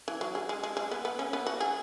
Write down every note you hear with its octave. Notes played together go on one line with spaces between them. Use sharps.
E3
F#3
G#3
G#3
G#3
G#3
B3
B3
C#4
B3
F#4
G#4